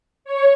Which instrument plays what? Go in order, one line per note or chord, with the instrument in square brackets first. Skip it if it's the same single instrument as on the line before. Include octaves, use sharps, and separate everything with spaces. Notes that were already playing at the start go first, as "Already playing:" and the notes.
[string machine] C#5